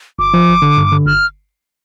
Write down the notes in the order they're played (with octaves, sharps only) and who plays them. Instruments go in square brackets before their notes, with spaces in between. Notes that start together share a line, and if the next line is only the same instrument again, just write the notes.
[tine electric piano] G1 [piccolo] D6
[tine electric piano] F3
G1
D3
G2
D3
[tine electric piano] G1 [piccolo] F6